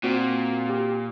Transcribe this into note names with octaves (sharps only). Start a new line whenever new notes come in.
A#2 C4 F#4
G4